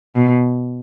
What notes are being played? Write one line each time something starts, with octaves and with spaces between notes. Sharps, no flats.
B2